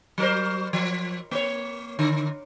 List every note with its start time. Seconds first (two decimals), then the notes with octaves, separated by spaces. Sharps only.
0.18 F#3 A#4 C5
0.73 F3
1.31 A#3 C#5
1.99 D3